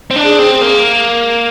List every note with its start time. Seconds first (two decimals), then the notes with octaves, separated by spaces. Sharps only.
0.11 C4
0.16 D4
0.24 G#4
0.39 C4
0.54 G#4
0.61 A#3